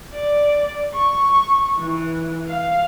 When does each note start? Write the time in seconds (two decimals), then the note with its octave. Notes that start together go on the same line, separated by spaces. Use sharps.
0.13 D5
0.94 C#6
1.78 E3
2.48 F5